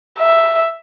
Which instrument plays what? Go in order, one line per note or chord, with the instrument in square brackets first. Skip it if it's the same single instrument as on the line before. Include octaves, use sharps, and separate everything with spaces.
[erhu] E5